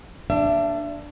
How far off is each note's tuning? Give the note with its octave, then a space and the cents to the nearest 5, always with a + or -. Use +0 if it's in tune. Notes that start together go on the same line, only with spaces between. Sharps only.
A#3 +0 D4 +0 E5 +30